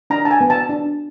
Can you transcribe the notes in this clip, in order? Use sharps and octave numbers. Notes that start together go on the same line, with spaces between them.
D4 A#5
A5
G#5
B3
A5
D4